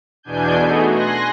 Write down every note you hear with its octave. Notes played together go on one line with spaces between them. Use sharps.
E2 B2 D4 G#5 G6
A3 B3 D#4 F#4 G#4
G#5 C6 F#6 A#6